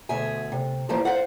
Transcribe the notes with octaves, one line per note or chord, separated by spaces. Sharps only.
D2 B2 G#4 E5 G#5
C3
E3 F3 G3 A#3 D#4 C5
C5 F5 F#5